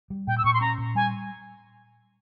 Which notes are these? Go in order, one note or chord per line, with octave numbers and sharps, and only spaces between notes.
G3
A#2 G5
E6
A#2 C#6
C6
C#4 A#5
A#2
G3 G#5